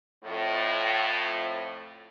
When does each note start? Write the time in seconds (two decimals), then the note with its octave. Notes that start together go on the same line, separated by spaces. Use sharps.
0.24 F2 A2